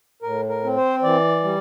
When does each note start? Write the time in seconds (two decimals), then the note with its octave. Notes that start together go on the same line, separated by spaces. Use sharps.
0.22 A2 A#4
0.49 A#4
0.64 C4
0.77 C5
1.03 E3 D5
1.43 G3